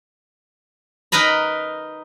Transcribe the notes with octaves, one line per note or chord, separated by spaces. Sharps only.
D#4 A#4 B4 A#5 B5